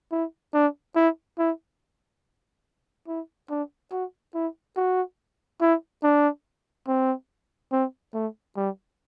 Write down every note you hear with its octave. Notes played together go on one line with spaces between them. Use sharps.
E4
D4
E4
E4
E4
D4
F#4
E4
F#4
E4
D4
C4
C4
A3
G3